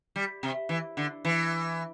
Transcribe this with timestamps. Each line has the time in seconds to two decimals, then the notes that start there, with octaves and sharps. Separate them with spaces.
0.16 G3
0.43 C3
0.69 E3
0.97 D3
1.25 E3